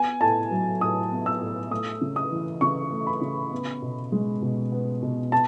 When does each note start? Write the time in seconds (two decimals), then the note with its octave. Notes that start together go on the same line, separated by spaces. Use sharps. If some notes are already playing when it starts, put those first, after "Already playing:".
Already playing: B3 G#5
0.21 A2 A5
0.51 F#3
0.81 A2 D#6
1.11 B3
1.26 E6
1.41 A2
1.71 A3 D#6
2.01 C#3
2.16 D#6
2.31 E3
2.61 C#3 C#6
2.92 A3
3.07 B5
3.22 C#3
3.51 B3
3.82 B2
4.12 G#3
4.42 B2
4.72 B3
5.02 B2
5.32 A5